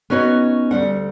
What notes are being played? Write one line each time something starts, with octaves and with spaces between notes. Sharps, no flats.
B3 C#4 D#4 F#4 C#5
D2 C#3 G3 F#5